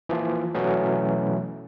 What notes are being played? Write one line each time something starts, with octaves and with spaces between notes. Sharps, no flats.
E3 F3 A#3 F4
B2 E3 F#3 A3 B3 C#4